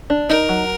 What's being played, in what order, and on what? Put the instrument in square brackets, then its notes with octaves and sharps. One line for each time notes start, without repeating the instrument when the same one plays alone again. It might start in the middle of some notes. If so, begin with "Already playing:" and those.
[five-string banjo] D4
[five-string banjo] D#4 [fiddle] A#4
[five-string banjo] F#3